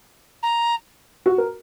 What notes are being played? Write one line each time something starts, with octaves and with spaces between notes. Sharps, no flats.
A#5
F#4
A#4